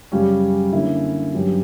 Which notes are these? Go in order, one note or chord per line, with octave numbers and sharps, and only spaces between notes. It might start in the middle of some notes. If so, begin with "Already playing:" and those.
F#2 C#3 G3 C#4 G4
D3 A#3 C#4 E4
G2 F#3 C#4 G4